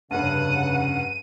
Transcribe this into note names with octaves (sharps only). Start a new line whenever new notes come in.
F1 G2 C#3 F#5 D#7